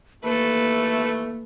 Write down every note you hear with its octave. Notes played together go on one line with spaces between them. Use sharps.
D#2 E3 A3 A#3 A4 B4